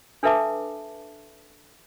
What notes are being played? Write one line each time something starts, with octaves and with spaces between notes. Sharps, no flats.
D4 A4 B4 E5 A5 D6